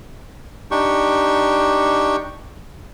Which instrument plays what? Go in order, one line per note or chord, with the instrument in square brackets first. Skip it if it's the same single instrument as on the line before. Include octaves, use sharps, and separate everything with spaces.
[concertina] D4 D#4 G4 C#6